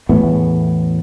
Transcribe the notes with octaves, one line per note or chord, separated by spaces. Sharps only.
E2 A2 A3 B3